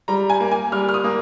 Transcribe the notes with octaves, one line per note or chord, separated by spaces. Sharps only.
G3 A#5
G#5
A#3
G#5
G3 F6
F6
D#6
A#3